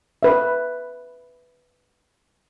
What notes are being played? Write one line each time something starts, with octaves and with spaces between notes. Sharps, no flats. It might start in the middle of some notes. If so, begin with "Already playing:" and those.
B4 E5